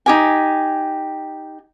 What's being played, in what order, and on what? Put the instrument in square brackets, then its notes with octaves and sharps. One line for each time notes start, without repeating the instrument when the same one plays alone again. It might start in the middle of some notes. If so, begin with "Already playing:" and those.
[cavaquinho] D#4 G4 G#5